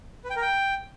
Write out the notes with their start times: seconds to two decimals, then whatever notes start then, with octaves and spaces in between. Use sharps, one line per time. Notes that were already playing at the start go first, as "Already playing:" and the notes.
0.24 B4
0.30 G5
0.36 A#4
0.42 G5